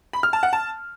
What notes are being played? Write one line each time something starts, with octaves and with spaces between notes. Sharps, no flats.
B5
F6
A5
F#5
A5